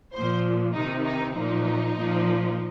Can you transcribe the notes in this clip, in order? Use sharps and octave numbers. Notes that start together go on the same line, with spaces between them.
A#2 F3 C5
C3 D#3 D#4
D#4
A#2 F3 D#4
A#2 F3